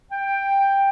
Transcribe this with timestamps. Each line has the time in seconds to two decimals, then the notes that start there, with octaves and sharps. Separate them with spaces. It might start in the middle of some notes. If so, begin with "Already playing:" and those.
0.11 G5